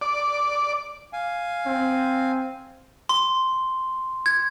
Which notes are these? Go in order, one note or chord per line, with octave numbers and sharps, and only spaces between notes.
D5
F5 G#5
C4
C6
G#6